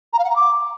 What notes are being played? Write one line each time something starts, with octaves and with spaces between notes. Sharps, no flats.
A#5
F5
F#5
A#5
D6